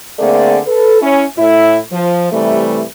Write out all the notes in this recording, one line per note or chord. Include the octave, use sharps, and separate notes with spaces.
D3 A3 A#3 C4 G#4 D5
A4 B4
C#4 E4
A2 E4
F3
C3 E3 G3 A3